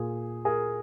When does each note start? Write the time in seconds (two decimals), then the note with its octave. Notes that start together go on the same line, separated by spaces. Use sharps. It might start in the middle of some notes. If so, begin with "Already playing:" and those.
Already playing: A#2 G#4
0.45 G#4 A#4